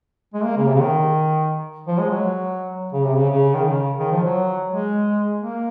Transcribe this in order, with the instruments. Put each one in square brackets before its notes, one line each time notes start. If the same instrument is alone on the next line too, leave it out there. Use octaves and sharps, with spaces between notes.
[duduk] G#3
A#3
C#3
C3
C#3
D#3
F3
G#3
F#3
C#3
C3
C#3
C#3
D#3
C#3
D#3
F3
F#3
G#3
A#3